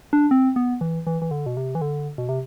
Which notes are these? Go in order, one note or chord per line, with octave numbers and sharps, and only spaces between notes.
D4
C4
B3
E3
E3
E3
D3
B2
C3
E3
D3
B2
C3